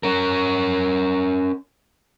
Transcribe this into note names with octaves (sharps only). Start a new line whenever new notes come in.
C#4 A#4